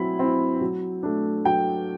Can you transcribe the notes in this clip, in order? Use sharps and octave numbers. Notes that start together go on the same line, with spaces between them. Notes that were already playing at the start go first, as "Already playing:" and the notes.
Already playing: F#3 C4 E4 B5
C4 E4
F#3
A3 D4
F#3 G5